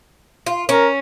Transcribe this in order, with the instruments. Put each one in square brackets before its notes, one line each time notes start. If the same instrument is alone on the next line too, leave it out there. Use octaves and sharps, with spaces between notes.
[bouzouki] F4
[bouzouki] C#4 [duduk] A#4